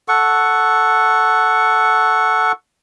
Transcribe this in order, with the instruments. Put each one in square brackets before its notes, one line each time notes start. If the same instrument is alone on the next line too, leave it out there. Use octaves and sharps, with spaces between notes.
[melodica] A4 F#5 C#6